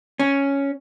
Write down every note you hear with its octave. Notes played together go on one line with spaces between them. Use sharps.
C#4